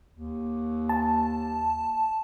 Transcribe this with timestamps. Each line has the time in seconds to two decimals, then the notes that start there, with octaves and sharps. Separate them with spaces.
0.14 D#2
0.89 A5